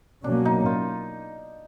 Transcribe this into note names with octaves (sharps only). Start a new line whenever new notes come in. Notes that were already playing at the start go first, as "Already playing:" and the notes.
B2 F#3 A#3 C#4 D4
D#4
F4